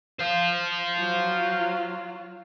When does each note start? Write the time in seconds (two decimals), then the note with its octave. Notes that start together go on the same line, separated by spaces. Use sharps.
0.19 C5 F5
0.98 F#3 F4